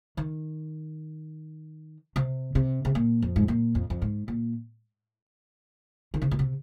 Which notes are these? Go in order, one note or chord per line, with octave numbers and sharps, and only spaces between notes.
D#3
C3
C3
C3
A#2
F2
G#2
A#2
F2
F2
G#2
A#2
D#3
C3
A#2
C3